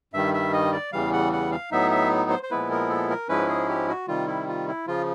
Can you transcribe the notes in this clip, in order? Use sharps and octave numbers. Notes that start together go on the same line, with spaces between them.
G2 D#3 G3 E5
E5
D#5
D5
E2 C#3 E3 G3 F5
F#5
F#5
F5
A2 F#3 B3 D#4 E5
E5
C5
C5
A#2 F3 G#3 B3 E4 B4
A#4
A4
A#4
G#2 F3 G#3 C#4 E4 B4
G#4
G4
F#4
C3 D#3 G3 F4
E4
F4
E4
C#3 F3 F4